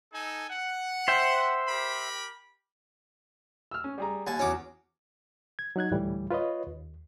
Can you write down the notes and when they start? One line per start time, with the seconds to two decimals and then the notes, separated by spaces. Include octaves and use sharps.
0.14 D#4 A4 G#5
0.50 F#5
1.08 C5 E5 G5
1.67 G4 A#4 B5
3.71 E6 F6
3.84 C#4
3.98 G3 G#4 A#5
4.27 D#2 G#5 A5
4.39 E2 C#4 F#4 D6
5.59 G#6
5.76 F#3 D#4 F#6 G#6
5.91 D2 A2 E3 G3
6.31 F4 B4 C#5 D#5
6.67 D#2